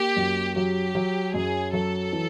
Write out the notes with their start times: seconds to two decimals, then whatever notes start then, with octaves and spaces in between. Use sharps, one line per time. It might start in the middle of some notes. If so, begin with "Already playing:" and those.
Already playing: A#3 G4
0.16 F#2
0.56 F#3 G4
0.95 F#3
1.34 F#2 G#4
1.73 F#3 A4
2.12 E3